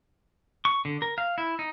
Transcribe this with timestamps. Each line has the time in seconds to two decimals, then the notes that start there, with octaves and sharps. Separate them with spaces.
0.65 C#6
0.85 D3
1.02 A#4
1.18 F5
1.38 E4
1.59 D#4